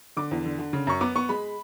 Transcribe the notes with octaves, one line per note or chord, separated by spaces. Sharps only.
D3 D6
E2
D3
D3
C#3
F#2 C#6
B3 D6
B3 C#6
G#3 B5